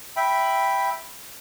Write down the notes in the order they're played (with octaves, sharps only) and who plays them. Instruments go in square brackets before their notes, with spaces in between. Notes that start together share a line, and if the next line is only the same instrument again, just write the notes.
[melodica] E5 G5 B5